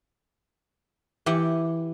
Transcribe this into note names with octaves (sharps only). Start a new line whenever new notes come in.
E3 G4 F#5